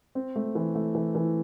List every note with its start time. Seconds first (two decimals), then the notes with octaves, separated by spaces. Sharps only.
0.15 C4
0.36 A3
0.55 E3
0.75 A3
0.95 E3
1.15 E3